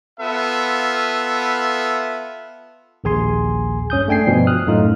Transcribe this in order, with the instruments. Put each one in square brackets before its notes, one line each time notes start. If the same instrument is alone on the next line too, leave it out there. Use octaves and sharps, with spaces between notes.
[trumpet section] B3 F4 A4 E5
[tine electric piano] A#1 D#2 G#4 G#5 C6
G2 C#4 D#6 G6
A3 D4 G5 G#5 C7
G2 B2 F3
D#6 F6 F#6
F#2 A2 A3 D#4 F4